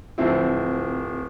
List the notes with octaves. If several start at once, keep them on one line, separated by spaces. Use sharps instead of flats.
D1 F3 C4 E4